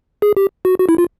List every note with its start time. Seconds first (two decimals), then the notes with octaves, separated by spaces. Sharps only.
0.22 G#4
0.37 G4
0.65 F#4
0.79 F#4
0.89 E4
0.98 F4